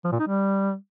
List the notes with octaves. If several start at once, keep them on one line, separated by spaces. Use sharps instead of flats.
F3
A#2
D#4
G3